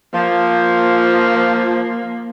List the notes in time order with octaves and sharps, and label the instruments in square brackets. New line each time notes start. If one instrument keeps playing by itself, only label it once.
[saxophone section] F3 [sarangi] A#3